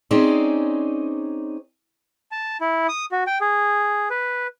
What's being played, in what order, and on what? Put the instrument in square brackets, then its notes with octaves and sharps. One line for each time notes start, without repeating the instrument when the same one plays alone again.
[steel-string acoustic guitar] C4 C#4 D#4 G#4 C5 D5
[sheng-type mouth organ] A5
E4
D#6
F#4
G5
G#4
B4